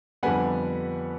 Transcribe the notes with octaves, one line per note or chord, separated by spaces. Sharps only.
F2 D3 G3 B3 F#5 G#5